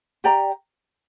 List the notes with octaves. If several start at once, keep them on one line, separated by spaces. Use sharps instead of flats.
G4 D5 G5 A#5